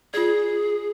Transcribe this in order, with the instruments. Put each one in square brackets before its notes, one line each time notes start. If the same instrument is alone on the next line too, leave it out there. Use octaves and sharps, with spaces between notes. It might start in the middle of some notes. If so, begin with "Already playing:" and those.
[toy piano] F4 D5 [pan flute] G#4